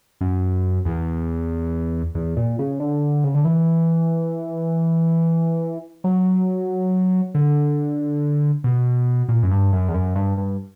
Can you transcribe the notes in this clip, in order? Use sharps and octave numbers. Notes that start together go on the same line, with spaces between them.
F#2
E2
E2
A#2
C#3
D3
C#3
D3
E3
F#3
D3
B2
A#2
F#2
G2
F#2
E2
F#2
G2
G2